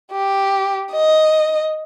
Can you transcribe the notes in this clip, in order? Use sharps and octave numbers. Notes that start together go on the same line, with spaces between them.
G4
D#5